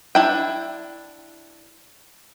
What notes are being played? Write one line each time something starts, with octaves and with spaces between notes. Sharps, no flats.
D4 E4 G5